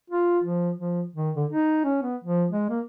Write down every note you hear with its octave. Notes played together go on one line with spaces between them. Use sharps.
F4
F3
F3
D#3
D3
D#4
C#4
B3
F3
G#3
A#3